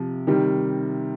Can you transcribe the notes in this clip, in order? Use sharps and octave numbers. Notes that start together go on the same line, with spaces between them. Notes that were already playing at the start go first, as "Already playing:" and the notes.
Already playing: C3 F3
C3 D#3 G3